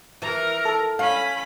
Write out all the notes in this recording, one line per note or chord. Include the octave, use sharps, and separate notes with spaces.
E3 A#4 A#5
A4
C#4 F5 B5